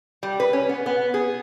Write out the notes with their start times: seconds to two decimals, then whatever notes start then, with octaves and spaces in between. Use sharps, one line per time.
0.23 G3
0.40 B4
0.53 C#4
0.69 B3
0.86 B3
1.14 G#4